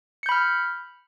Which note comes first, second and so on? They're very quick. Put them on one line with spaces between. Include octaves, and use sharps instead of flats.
C#7 G6 B5 F6